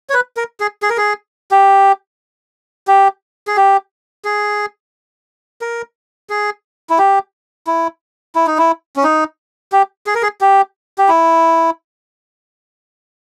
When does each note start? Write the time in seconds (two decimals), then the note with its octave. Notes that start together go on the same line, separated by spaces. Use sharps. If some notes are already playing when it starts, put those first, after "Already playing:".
0.10 C#5
0.14 B4
0.37 A#4
0.60 G#4
0.82 G#4
0.90 A#4
0.97 G#4
1.51 G4
2.88 G4
3.47 G#4
3.56 G4
4.25 G#4
5.61 A#4
6.30 G#4
6.90 E4
6.98 G4
7.67 E4
8.35 E4
8.47 D#4
8.58 E4
8.96 C#4
9.04 D#4
9.72 G4
10.07 G#4
10.15 A#4
10.22 G#4
10.41 G4
10.98 G4
11.09 E4